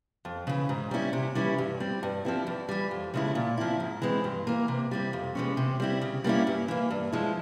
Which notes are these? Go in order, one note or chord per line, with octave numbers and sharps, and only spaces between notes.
F2
C#3 E3
G#2
G3 C#4 E4
C3
E3 G3 C#4 E4
G2
G3 C4
G2
F3 C4 E4
E2
E3 G3
F2
C#3 F3 G#3 E4
A#2
F3 C4 E4
G#2
E3 G#3 C4
G2
E3 A#3
C3
G3 C4 E4
F2
C3 E3 G#3 C#4
C3
G3 C4 E4
C#3
G3 A#3 C#4 E4
G2
E3 A#3
G2
F3 G#3 E4